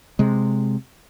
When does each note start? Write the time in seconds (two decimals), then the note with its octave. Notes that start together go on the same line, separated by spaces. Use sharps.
0.19 C3 G#3